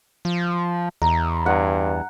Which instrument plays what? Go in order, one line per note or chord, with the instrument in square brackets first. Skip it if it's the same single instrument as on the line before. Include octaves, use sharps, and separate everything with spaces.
[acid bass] F3
[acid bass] E2 [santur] A#5
[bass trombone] G2 [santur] F#5